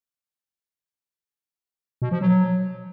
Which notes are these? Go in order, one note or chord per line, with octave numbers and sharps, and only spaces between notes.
B2
F3
F#3